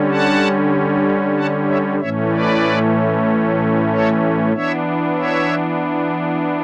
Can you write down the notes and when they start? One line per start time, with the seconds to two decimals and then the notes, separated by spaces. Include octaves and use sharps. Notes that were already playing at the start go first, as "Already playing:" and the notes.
Already playing: D3 G3 C#4
0.10 F#5 A5
1.37 F#5 A5
1.68 C#5 E5
1.99 A2 E3 A3 C#4 C#5 E5
2.31 B4 D5
3.90 A4 C#5
4.53 E3 B3 D4 C#5 E5
5.16 C#5 E5